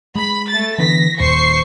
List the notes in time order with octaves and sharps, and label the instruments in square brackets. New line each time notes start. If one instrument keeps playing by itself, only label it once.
[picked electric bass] G#3 [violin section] B5
[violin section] A3 A6
[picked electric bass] D3 E3 B3 [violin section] A#6 B6
[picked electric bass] D#1 D#2 A#2 [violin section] C5 C#6 C7